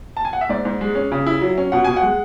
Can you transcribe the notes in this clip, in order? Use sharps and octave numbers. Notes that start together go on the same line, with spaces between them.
A5
G#5
F#5
E5
G#2 D5
G#2
G#3
C#4
C#3
E4
F#3
C#4
B2 F#5
B2 G#5
F#5
G#3